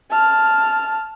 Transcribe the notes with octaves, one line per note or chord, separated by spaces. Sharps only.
A5 F6